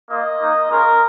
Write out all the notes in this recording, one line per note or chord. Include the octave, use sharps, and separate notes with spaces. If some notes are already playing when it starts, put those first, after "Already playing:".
A#3 F4 D#5
A#3 D#4
G#3 C#4 F4 A#4